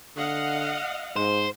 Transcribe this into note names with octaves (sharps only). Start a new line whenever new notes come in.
D3 D#5 F5 F#5
G#2 C5